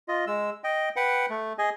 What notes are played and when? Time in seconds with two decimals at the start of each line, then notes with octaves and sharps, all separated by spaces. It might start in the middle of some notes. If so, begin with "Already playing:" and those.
0.08 F4 D#5
0.27 G#3 E6
0.64 D#5 G5
0.96 B4 F#5 G5
1.30 A3
1.58 G#4 D#5 G#5